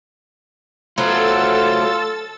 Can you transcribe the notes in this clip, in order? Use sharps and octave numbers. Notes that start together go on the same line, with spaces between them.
F#3 A3 B3 F4 A4 C5 E6 A6